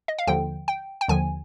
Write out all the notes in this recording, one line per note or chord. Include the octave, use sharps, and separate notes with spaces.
D#5
F5
D#2 D3 F3 G5
G5
G5
D#2 D3 F3 G#5